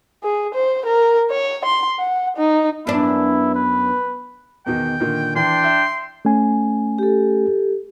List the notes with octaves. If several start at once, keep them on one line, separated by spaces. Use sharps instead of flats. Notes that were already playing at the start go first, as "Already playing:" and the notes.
G#4
C5
A#4
C#5
C6
F#5
D#4
F#2 B3 D4 E4
B4
E2 B2 D#3 G5
A#2 D3 D#3
E3 D4 G5 C6
E5
A3 C#4 G#5
G4 A4